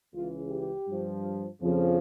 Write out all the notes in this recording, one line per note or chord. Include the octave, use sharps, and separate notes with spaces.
C#2 C#3 E3 F4
G4
G2 F3
F2 C#3 F3